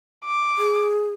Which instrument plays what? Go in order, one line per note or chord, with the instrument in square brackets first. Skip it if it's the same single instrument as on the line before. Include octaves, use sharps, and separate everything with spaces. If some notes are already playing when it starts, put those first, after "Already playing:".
[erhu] D6
[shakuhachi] G#4